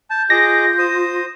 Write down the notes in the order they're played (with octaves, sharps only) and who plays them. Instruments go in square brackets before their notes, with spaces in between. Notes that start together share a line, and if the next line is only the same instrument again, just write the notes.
[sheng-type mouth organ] A5 [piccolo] G6
[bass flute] F4 [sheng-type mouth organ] G#4 D#5 D6 [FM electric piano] A#6
[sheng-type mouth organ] C5 D#6